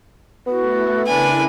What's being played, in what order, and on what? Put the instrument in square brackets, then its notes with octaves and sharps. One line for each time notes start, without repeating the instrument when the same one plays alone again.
[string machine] A3 E4 A4 [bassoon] B3 [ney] F#4
[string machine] C#3 E4 A#4 [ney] D4 [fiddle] B4 G#5